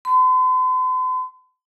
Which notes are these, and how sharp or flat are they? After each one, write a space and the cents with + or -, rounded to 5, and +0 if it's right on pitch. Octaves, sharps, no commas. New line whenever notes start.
C6 -45